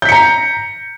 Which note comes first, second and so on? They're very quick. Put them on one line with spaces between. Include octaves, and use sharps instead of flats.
G6 B6 C#7 A#5